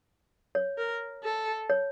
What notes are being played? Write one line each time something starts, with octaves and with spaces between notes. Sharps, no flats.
C#5
A#4
A4
C#5